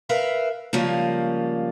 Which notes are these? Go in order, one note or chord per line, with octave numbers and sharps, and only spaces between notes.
A#4 B4 E5 F5
C#3 F3 G3 G#3 A#3